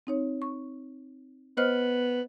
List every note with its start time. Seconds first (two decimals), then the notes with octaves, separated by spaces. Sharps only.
0.07 C4 D#4 C#5
0.42 C#6
1.57 B3 C5 D#5 F6